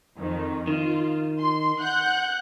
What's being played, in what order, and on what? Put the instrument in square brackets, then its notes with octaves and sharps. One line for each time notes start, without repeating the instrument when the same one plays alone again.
[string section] F2 D#3
[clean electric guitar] D#3 [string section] F4
[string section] C6
F#5 F#6 G6